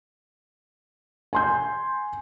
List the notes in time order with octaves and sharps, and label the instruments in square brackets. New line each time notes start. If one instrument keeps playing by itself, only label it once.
[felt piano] G#5 C6 G6